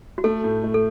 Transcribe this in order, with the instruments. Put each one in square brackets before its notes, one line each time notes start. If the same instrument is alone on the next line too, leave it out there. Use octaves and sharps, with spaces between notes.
[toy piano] F#4
[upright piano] A3 [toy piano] A4
[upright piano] A2
A3
[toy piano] A4